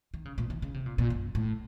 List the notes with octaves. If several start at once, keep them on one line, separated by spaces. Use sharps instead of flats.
D#3
C#3
A#2
D#3
C#3
C3
A#2
A#2
F#2
A2